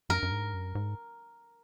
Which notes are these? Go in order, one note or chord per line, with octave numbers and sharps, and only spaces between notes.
F#2 A#4
F#2
G#2
F#2
G#2